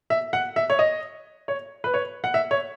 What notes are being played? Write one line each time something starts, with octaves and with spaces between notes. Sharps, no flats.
E5
F#5
E5
C#5
D#5
C#5
B4
C#5
F#5
E5
C#5